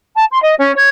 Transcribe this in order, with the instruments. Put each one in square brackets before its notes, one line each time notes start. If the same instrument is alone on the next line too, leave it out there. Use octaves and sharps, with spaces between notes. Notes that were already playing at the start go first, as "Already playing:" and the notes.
[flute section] A5
C6
D#5
C#4
C#5